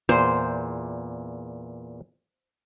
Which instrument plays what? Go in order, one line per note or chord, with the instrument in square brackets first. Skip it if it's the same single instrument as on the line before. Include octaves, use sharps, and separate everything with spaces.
[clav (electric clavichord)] E2 A#2 [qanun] C5